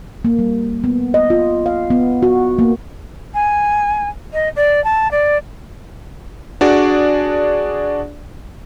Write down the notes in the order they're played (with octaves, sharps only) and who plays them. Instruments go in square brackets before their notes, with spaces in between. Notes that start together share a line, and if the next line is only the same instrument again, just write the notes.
[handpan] A#3
G3
B3
D#5
F4
F5
B3
F#4
A#3
[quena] G#5
D#5
D5
A5
D5
[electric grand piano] D4 F#4 G#4 D5